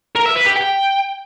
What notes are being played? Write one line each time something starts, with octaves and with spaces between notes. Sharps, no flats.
A#4
E5
B4
G4
G5